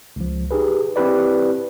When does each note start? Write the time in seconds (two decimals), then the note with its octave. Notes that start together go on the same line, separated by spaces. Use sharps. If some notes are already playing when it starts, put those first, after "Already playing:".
0.16 C#2 F3
0.51 D#4 G4 G#4 B4
0.96 C4 E4 G4 B4 D5